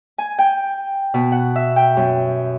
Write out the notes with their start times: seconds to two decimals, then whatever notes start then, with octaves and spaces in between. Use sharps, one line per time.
0.18 G#5
0.39 G5
1.14 B2
1.32 F#5
1.56 E5
1.76 G5
1.97 F#2